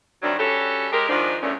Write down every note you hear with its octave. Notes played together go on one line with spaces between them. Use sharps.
C3 D#3 F#3 G3 D4
G3 C#4 F#4 G4 A4
G#3 G4 A#4
G#2 D#3 F3 C#4 D4 F4
E2 G2 A#2 D3 A3 C#4